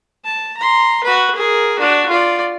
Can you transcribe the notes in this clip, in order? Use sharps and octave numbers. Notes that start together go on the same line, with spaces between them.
A5
A#5 C6
F#4 B4
G#4 A#4
D4 F#4
F4 D5